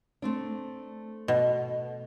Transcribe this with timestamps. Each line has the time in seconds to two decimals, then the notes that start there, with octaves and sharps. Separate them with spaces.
0.22 A3 C4 D4
1.28 B2